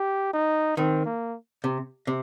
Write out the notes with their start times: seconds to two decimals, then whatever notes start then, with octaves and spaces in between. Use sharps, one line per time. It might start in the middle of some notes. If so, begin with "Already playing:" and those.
Already playing: G4
0.34 D#4
0.77 D#3 C4
1.06 A#3
1.64 C3
2.07 C3